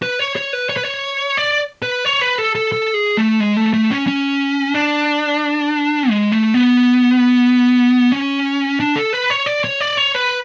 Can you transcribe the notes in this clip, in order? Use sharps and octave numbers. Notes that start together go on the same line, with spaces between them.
B4
C#5
C#5
B4
C#5
B4
C#5
D5
B4
C#5
B4
A4
A4
A4
G#4
A3
G#3
A3
A3
C#4
C#4
D4
G#3
A3
B3
C#4
D4
A4
B4
C#5
D5
C#5
D5
C#5
B4